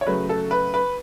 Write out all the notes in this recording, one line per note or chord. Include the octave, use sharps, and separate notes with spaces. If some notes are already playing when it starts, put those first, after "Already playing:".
C#5
C#3 F#3 A3 B4
A4
B4
B4